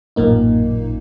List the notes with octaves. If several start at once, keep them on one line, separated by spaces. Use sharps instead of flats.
A1 F#2 A#2 A#3 D#4